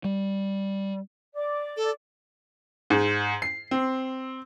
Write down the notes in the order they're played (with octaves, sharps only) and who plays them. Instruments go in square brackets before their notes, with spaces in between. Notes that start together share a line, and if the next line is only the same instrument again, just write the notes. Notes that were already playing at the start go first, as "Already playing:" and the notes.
[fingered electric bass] G3
[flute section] D5 D6
[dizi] A4
[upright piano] G#2
C7
C4